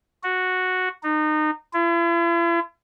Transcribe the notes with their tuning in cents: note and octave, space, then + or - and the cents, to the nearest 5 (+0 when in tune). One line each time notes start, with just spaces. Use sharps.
F#4 -5
D#4 -25
E4 +45